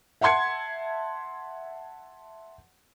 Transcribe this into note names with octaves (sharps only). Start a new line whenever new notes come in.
E5 F#5 A5 C6 G#6 C#7